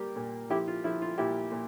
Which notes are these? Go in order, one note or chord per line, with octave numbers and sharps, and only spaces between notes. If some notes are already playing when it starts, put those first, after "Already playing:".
Already playing: G3 A#3 G4
A#2
F3 E4 G4
F4
F3 E4
F4
A#2 E4 G4
A#2